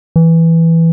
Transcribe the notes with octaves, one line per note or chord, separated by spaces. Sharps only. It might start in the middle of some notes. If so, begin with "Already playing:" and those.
E3